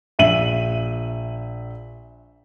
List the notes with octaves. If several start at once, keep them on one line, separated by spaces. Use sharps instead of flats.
A#1 E5 D#7 F#7